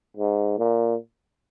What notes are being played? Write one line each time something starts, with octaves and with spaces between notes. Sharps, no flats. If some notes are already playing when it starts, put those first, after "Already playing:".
G#2
A#2